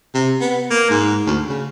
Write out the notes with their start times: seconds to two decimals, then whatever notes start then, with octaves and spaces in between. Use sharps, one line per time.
0.14 C3
0.41 B3
0.70 A#3
0.90 G#2
1.26 D2
1.49 C#3